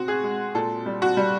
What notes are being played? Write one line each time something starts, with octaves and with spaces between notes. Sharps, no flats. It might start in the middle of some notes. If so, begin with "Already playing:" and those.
Already playing: B2 C4 F#4
G#4
G#3
A#2 A4
G3
F#4
G3